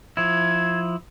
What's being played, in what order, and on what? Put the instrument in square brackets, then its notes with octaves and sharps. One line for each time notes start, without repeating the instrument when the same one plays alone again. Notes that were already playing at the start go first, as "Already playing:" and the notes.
[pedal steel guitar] F3 E4 [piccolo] G#6